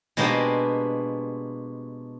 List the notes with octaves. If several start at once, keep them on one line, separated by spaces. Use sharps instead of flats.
B2 G#3 A#3 D4 G4 C5